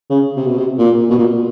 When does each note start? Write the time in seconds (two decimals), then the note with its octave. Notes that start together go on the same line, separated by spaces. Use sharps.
0.10 C#3
0.36 C3
0.47 B2
0.58 C3
0.78 A#2
1.10 B2
1.18 A#2